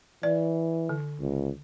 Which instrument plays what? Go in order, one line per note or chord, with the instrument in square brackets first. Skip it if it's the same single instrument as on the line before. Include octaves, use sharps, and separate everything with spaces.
[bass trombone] E3 [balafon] D5
[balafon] D3
[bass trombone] C#2